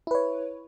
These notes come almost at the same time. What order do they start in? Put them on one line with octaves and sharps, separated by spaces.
E4 B4 C#5